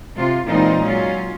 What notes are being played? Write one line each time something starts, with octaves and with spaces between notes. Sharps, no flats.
C3 F4
A#2 E3 G#3 C4 D#4 F4
F#3 C#4 F4